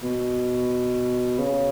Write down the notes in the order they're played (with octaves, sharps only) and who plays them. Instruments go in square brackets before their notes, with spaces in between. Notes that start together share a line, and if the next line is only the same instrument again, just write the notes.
[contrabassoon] B2
C#3